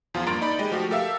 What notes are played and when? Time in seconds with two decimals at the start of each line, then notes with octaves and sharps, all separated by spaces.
0.14 E2 F3 F4
0.26 G2 A#3 A#5 C6 A6 D7
0.41 D#4 D5 B5
0.59 G#3 G4 D#5
0.72 F3 A3 F#4 G4
0.90 G4 A4 A#4 E5 F5 E6